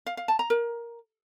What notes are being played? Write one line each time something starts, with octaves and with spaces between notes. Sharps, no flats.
F5
F5
A5
A#5
A#4